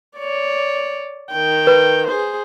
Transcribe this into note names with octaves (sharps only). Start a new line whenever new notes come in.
C#5 D5
D#3 G5
B4
G#4 C5